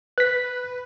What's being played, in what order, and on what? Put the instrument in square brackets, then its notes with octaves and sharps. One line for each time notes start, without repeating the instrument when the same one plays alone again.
[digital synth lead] B4 [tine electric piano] F#6 B6